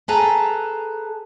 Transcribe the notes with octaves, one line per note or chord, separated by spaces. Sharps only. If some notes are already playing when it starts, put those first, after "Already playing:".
G#4 A4 B4 A5 A#5